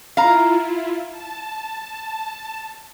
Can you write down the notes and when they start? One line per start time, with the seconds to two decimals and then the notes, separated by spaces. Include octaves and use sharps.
0.17 E4 F4 F5 A#5
1.10 A5